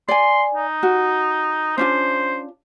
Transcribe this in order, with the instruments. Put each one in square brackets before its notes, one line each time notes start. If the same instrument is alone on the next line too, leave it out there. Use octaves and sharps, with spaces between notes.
[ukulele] D5 G#5 [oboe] C6
[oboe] D#4
[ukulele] F#4
[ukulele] C#4 D4 F4 [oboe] C5